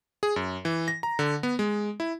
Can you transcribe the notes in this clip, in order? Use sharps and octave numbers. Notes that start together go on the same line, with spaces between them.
G#4
F#2
E3
A#6
A#5
D3
B3
G#3
E4